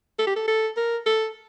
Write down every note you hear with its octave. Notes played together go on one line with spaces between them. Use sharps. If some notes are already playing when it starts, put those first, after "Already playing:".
A4
G4
A4
A4
A#4
A4